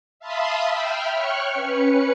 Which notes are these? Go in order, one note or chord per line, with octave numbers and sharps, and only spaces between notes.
E5 F5 A5 B5 C6 D#6
E5 G5 B5 F6
C#5 G5 C#6 F6 F#6 C#7
C#4 B4 C#7